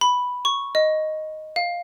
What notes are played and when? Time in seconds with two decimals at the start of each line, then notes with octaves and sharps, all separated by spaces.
0.01 B5
0.45 C#6
0.75 D#5
1.56 F5